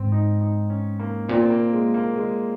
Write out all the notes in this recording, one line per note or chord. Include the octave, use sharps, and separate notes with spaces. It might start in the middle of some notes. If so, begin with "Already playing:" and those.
Already playing: G#2 C4
D#4
D#4
C#4
A#3
A#2 C4
C4
A#3
G#3
A#3
G#3